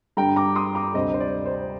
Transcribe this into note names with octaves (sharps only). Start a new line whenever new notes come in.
G2 D3 G3 G5 A#5
A#5 D6
C6 D#6
A#5 D6
D2 C3 G3 C5 D#5
C5
D5
C5